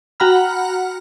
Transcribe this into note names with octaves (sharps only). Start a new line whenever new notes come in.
F#4 F#5 G5 A#5 B5 F6